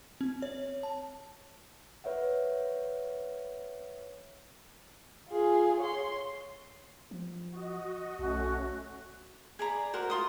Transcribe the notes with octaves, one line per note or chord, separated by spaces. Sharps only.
C4
C#5
A5
B4 C#5 E5 F#5
F4 G#4
C#5 C6
F3
F#4 D#5
B1 A3 C#4 F#4
G#4 D5 A#5 B5
F#4 A#4 C5
F4 C6 D#6